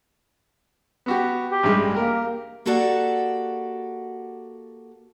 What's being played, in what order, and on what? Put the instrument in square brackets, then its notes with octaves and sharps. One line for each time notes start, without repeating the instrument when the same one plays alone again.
[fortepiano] B3 F#4 G4
[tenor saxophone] G4
[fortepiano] A1 G2 G#3
[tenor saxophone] A#3 [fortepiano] G4 A#4
[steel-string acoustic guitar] A#3 F#4 G4 A4 D5 F#5